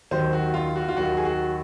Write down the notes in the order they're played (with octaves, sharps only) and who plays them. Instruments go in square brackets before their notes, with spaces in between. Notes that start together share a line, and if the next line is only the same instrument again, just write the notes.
[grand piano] D#2 D#3 F#3 C5
F#4
F4
F#4
F4
D#2 D#3 F#3 F#4
G#4
F#4